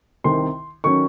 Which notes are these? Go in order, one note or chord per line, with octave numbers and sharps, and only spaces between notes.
C2 C3 D#3 C6
D#3 F#3 C#4 C#6